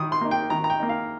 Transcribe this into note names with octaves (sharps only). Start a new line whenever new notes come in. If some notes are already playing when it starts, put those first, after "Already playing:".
Already playing: D#3 D#6
C6
A#3 D#4
G5
D#3 A#5
A#5
G5
A#3 D#4
F5